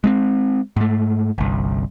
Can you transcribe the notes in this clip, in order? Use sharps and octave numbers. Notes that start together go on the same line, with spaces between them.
G#3 B3 C4
G#2 A3
G1 C2